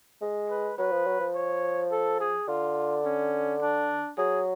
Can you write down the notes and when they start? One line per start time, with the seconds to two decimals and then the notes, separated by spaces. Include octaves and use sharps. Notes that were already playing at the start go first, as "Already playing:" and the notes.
0.22 G#3
0.50 B4
0.78 F#3 B4
0.92 F3
1.07 F#3
1.20 F3
1.34 C#5
1.91 A4
2.20 G#4
2.48 D3 F4
3.05 C#4
3.61 D4
4.17 F#3 G#4